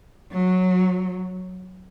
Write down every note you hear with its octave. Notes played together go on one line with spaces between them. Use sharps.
F#3